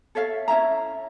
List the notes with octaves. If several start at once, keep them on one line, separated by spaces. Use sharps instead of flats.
A4 C#5 E5 F5
C#4 E4 E5 A#5